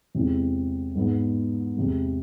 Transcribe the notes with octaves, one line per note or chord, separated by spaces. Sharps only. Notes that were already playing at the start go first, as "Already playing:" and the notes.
E2 C3 G#3 C4 E4
G#2 G#3 B3
E2 C3 G#3